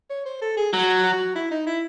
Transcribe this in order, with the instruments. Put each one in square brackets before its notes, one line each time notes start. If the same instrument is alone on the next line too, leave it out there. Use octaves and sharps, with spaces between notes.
[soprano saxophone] C#5
C5
A4
G#4
[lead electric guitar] F#3 [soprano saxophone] F#4
[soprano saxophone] F#4
E4
D#4
E4